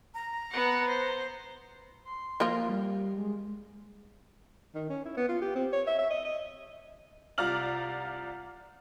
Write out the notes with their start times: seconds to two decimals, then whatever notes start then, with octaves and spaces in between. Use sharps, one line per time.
0.14 A#5
0.51 B3 F#5
0.87 C5
2.05 C6
2.40 F3 A#3 F4
2.69 G3
3.17 G#3
4.75 D#3
4.90 C#4
5.06 E4
5.17 B3
5.29 F4
5.42 G4
5.55 C4
5.73 C#5
5.87 E5
5.99 E5
6.11 D#5
6.25 D#5
7.38 C2 F4 D5 A#5 F6 F#7